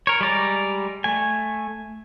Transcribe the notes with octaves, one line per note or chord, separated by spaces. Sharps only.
A#4 C#5
G3 G#3 D5 A#5
A3 G#5